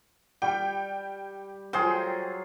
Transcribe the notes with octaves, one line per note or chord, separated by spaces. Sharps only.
G3 G5
F#3 F4 G#4 C5 G5